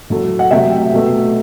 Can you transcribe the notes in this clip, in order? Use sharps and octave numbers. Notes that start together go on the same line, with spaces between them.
A2 F#3 A3
F#5
C3 F#3 A3 E5 G5
B2 A3